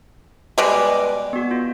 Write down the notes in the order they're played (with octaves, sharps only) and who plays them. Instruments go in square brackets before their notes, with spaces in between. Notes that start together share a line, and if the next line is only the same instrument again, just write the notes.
[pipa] B2 G3 G#3 [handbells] B4
[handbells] D6
B3 F#4
F4